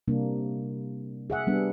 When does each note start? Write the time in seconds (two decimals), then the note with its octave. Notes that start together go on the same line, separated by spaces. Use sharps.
0.08 C3 G3 A#3 D4
1.30 G#4 E5 F#5
1.47 G3 B3 D4